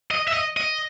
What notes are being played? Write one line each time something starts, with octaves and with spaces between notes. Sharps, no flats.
D#5
E5
D#5
D#5